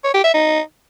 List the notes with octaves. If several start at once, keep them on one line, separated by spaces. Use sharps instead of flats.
C#5
G4
E5
D#4